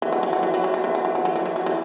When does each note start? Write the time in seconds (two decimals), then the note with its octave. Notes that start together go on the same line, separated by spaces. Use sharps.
0.02 E3
0.12 F#3
0.23 E3
0.33 F#3
0.43 E3
0.54 F#3
0.64 E3
0.74 F#3
0.84 E3
0.95 F#3
1.05 E3
1.15 F#3
1.25 E3
1.35 F#3
1.45 E3
1.56 F#3
1.66 E3